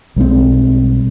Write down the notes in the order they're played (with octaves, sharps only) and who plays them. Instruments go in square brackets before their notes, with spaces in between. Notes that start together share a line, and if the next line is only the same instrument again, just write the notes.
[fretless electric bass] B1 G3 G#3 C4